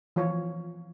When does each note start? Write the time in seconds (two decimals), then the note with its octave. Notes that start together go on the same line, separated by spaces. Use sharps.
0.16 E3 F3 F4 C#5